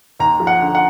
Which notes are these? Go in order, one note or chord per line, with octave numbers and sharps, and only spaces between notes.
D#2 A#5
F3
F#5
D3
F#5